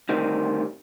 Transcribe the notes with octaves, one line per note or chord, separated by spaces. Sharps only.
D2 C3 D#3 G3